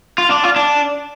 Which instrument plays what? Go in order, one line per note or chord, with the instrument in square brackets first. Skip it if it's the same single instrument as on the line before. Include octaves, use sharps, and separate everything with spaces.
[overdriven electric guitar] F4
D4
F4
D4